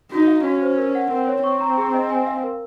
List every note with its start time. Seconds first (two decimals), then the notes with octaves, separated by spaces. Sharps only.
0.11 D#4 F#4
0.27 F5
0.44 C#4 F#4
0.61 C5
0.78 A#4
0.95 F#5
1.10 C4 A#4
1.28 C#5
1.44 C4 C#6
1.61 A#5
1.78 G#4
1.94 D#5
2.10 G#5
2.27 F5
2.43 A#4